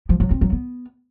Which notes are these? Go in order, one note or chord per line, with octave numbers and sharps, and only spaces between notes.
F3
F#3
C4
F#3
B3